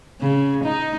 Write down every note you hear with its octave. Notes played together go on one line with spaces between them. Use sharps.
C#3
D#4